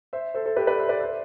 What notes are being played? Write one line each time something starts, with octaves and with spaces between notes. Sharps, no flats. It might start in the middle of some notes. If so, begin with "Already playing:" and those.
C5 E5
A4 C5
A4 C5
G4 B4
B4 D5
C5 E5
B4 D5
C5 E5